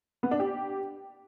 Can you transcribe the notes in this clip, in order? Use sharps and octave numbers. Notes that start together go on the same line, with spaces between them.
B3
D4
G4